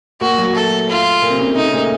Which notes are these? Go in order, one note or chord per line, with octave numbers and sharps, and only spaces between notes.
A#2 A#3 F#4
F#3
A3 A4
F4
A#2 A#3
C3 C4
C#3 C#4
C3 C4
A3 D#4
C#3 C#4
A#2 A#3
A3